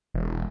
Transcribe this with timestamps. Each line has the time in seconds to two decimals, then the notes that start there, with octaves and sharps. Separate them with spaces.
0.14 E1